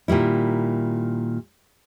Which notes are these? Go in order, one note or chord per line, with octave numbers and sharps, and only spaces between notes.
A#2 D#3 G3 E4